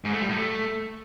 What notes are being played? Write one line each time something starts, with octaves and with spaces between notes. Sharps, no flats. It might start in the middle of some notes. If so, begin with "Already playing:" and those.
G#2
A3
G3
A2
A3